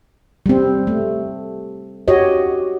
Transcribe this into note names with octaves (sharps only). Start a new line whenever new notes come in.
G3 C4
A3
F#4 G4 C#5 D#5